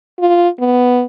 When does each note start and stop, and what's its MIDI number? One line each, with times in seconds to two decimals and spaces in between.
0.20 0.48 65
0.60 1.04 59